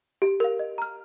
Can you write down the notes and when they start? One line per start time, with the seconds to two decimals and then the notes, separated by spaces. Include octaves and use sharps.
0.22 G4
0.40 A#4 F5
0.59 D#5
0.78 A#5 F6